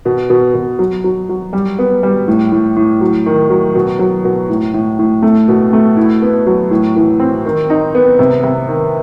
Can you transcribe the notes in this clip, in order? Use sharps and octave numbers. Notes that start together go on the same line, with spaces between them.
B2
B2
B2
F#3
F#3
F#3
G3
B3
G3
A2
A2
A2
F#3
D#3
F#3
B2
F#3
B2
A2
A2
A2
A3
B2
A3
E4
B3
F#3
A2
E3
C4
D#3
D#4
B3
C3
C3
D#3